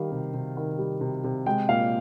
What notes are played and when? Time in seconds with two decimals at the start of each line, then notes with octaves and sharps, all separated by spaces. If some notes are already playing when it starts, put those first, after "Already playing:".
Already playing: D#3 G3 F5
0.11 C3
0.34 C3
0.57 D#3
0.79 G3
1.01 C3
1.24 C3
1.46 G#3 G5
1.69 A#2 F5